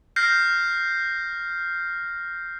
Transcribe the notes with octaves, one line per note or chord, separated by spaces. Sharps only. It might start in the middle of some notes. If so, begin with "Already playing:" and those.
F6 G6 A#6 C7